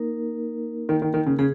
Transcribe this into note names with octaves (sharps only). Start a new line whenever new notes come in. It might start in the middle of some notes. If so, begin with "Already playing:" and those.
Already playing: A#3 D#4 A#4
D#3
D#3
D#3
C#3
C#3 G#4